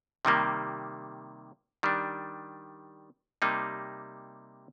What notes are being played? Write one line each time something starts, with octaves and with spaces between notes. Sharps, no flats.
C3 D#3 G3 A#3
D#3 G3 D4
C3 G3 A#3 D#4